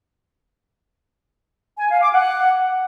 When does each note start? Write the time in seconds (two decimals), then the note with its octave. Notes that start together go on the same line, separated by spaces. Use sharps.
1.79 G#5
1.90 F5
2.02 D6
2.14 F#5